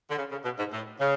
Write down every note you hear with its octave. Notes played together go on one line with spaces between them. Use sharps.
D3
C#3
C#3
B2
G#2
A2
C#3